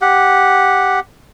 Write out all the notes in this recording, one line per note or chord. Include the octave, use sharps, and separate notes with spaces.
G4 F#5